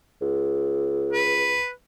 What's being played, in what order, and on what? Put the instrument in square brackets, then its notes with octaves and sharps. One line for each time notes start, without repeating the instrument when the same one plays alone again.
[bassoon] C#2
[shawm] B4